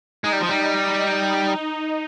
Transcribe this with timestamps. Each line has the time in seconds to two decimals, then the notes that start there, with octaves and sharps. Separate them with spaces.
0.24 G#3 D#4
0.33 G3
0.41 F3
0.49 G3
0.57 D#4